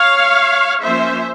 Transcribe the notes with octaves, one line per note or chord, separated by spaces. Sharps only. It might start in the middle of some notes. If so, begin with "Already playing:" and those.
Already playing: C#5 F5
F3 A#3 C#4 C5 E5